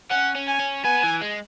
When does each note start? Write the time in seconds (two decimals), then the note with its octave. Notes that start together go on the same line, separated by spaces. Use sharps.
0.10 C#4 F#5
0.35 C#4
0.47 G#5
0.59 C#4
0.84 B3 G#5
1.03 E3
1.22 G#3